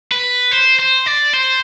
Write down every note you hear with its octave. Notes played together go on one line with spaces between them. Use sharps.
B4
C5
C5
D5
C5